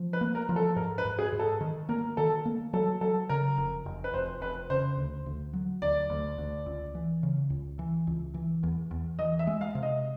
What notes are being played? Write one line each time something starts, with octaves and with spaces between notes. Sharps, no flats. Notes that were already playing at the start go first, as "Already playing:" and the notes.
Already playing: F3
B4
A#3
A#4
F3
A4
G#2 A#4
B4
G#2
G#4
G#2
A4
D#3
A#3 A#4
D#3 A4
A#3
F#3 A4
F#3 A4
C#3 A#4
F1
F1
B4
F1 C5
F1 B4
C#3 C5
D2
D2
F#3
D2 D5
D2
D2
C#2
E3
C#3
C#2
E3
C#2
E3
E2
E2
E3 D#5
E5
G#3
F5
C3
D#5